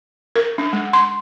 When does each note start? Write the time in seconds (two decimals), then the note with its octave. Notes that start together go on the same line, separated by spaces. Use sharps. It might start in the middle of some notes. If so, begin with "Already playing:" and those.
0.36 A#4
0.58 D4
0.73 G#3
0.93 C6